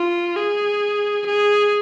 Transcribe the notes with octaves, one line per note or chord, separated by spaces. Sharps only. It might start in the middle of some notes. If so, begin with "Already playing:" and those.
Already playing: F4
G#4
G#4